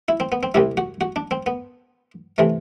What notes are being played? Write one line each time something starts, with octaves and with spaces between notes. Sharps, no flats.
E4
C4
B3
C4
C2 C3 G3 E4
F#4
F#4
D4
C4
B3
C3 E3 A3